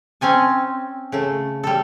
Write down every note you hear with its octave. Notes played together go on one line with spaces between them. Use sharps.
C4 C#4 G#5 A5
C#3 A3
G3 A4